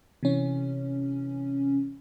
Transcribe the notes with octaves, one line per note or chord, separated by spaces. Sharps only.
C3 E3 C#4